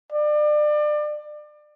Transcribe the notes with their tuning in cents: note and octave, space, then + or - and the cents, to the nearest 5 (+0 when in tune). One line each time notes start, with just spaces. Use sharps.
D5 +30